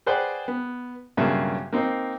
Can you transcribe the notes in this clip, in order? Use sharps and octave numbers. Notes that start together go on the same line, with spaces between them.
G#4 B4 C5 D5 F#5 G5
B3
B1 G2 C#3 A#3 E5
A#3 C4 D#4